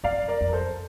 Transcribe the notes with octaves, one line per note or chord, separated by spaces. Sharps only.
F2 D5 F5
A#4 D5
F2
A#4
A4 C5